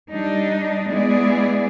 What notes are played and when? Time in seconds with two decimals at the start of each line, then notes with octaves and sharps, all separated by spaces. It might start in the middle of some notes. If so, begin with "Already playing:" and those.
0.10 G3 D4 D#4
0.89 G#3 B3 E4 G#4 D5